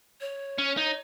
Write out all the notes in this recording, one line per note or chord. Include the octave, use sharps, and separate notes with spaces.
C#5
C#4
D#4